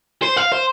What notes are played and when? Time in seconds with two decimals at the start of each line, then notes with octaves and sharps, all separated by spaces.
0.23 C5
0.37 F5
0.52 C5